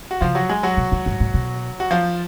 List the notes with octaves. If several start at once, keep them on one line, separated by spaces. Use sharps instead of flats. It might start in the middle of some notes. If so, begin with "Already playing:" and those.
F#4
C#3 F3 F4
F#3 F#4
G#3 G#4
F#3 F#4
B2
A2
G#2
A2
B2
F#4
F3 F4